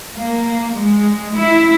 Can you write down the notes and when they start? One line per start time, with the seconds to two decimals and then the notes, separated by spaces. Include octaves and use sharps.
0.15 A#3
0.75 G#3
1.36 E4